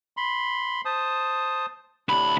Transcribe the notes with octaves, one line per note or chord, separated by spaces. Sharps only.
B5 C6
C5 A5 D#6
D2 A2 C3 D4 B5